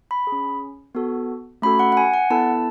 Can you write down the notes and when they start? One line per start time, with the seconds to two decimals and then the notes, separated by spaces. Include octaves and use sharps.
0.11 B5
0.27 G#4
0.32 C#4
0.95 B3 F#4 A4
1.62 A3 C#4 F#4 A4 B5
1.79 F#5
1.92 F#5
1.97 G#5
2.14 F#5
2.30 B3 E4 A4 A5